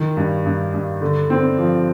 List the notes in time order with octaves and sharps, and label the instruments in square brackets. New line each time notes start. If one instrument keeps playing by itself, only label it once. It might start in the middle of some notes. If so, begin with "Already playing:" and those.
Already playing: [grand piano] D#3
G2
G2
G2
D3
C4
F3